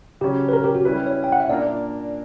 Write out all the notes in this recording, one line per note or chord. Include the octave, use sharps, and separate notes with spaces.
C#3 F#3 C#4 G4
B4
A#4
G4
F#4
G3 C#4 E4 B4
C#5
G5
F#5
E5
A#2 A#3 D4 A#4 D5